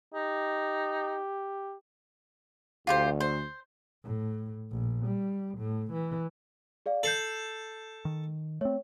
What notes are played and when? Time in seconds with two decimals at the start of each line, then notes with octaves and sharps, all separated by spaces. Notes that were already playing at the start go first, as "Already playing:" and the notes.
0.14 D#4 G4
2.87 D2 F4 G4 C5
3.20 C5
4.04 A2
4.71 A#1
5.06 G3
5.58 A2
5.93 E3
6.86 G#4 D5 F5
7.03 A4 G6 C7 F#7
8.05 D#3
8.61 A3 C4 C#5